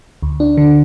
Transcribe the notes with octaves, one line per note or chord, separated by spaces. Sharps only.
D2
D4
D3